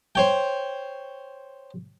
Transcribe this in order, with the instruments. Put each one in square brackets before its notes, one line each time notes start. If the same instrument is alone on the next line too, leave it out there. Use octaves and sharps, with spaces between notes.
[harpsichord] C5 C#5 G5